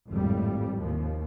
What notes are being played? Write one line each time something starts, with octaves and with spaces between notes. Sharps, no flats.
G#1 F2 A2 G3
D#2 F3